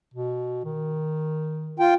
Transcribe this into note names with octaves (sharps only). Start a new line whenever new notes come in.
B2
D#3
F4 G5